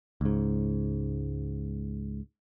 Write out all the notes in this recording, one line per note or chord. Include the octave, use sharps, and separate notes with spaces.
C#2 G#2